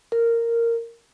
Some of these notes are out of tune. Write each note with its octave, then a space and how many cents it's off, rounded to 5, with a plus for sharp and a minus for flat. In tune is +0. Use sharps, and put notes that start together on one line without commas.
A#4 -10